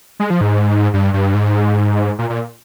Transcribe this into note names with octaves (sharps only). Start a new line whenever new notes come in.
G#3
F3
G#2
G2
G2
G#2
A#2
A#2